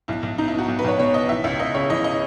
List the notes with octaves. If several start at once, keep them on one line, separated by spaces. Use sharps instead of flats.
B1 E4
B1
B2 D#4
E4
B2 F#4
B1
B4
B1 C#5
B2 C#5
B2 D#5
E3 E5
C#2 E5
C#2 D#5
C#3 C#5
E3 D#5
D#5